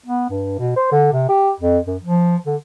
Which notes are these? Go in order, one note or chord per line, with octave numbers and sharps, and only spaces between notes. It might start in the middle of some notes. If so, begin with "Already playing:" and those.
B3
G2
B2
C5
D3
C3
G4
F2
F#2
F3
D3